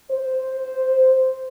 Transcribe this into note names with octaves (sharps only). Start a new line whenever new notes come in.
C5